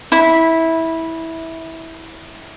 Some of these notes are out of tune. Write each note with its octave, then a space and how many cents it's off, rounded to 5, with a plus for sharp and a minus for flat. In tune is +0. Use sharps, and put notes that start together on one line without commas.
E4 -15 B5 +0